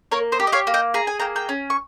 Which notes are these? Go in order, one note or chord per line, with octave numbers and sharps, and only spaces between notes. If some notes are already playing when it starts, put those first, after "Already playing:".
A#3 A#4 C#5
C5 D#5
G4
D#5
C#5 F5
A#3
D#5 G5
G#4 A#5
G#5
A#3 G5 A#5
G5 A#5
C#4
C#6